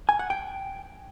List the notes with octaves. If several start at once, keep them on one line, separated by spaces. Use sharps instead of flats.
G#5
F#5
G5